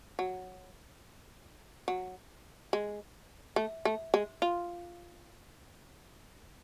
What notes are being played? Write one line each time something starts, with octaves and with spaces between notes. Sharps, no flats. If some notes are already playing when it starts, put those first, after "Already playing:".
F#3
F#3
G#3
A3
A3
G#3
F4